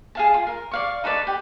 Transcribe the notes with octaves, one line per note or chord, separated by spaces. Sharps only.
G#4 F5 A5
F4
A#4
D5 F5 C#6
D#4 A4 B4 D5
G4